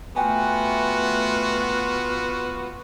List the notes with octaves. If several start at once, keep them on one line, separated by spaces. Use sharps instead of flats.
A3 B3 F4 F#4 G5 G#5